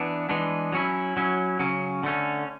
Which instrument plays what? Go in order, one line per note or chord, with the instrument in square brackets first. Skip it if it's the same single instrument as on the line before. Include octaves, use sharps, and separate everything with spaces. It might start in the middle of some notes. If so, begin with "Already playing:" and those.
Already playing: [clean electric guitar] E3 B3 D4
E3 G#3 B3 D4
F#3 C#4 E4
F#3 C#4 E4
C#3 F#3 C#4
D3 A3 C#4